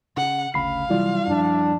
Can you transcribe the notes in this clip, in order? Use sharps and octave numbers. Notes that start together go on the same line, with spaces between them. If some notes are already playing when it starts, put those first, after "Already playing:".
C#3 F#5
G1 D2 C#3 F5 B5 C7
C3 E3 F#3 G3 E4 F4 D5
F#2 F3 D4